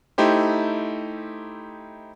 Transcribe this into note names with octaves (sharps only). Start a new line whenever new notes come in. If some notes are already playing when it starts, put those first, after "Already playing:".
A3 D#4 E4 G4 C5